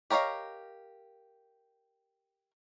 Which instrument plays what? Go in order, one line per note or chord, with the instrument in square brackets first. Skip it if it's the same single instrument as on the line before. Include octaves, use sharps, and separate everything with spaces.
[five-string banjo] G4 A#4 C#5 D#5 F5